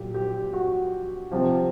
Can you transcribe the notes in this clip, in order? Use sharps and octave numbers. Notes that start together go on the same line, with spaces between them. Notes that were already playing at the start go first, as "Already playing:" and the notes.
Already playing: A#2 F#3 G4
G4
F#4
C3 F3